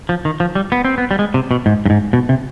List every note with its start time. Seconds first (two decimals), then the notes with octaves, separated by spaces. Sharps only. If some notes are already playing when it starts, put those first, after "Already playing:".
0.09 F3
0.25 D#3
0.40 F3
0.55 G3
0.72 B3
0.85 C4
0.98 B3
1.11 G3
1.19 G#3
1.34 C3
1.51 B2
1.66 G#2
1.86 G2
1.90 G#2
2.13 B2
2.29 C3